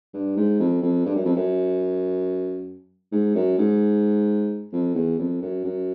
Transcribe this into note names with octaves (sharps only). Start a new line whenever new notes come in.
G2
G#2
F2
F2
G2
F#2
F2
F#2
G#2
F#2
G#2
F2
E2
F2
F#2
F#2